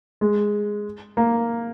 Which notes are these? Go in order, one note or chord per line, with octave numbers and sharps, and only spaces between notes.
G#3
A#3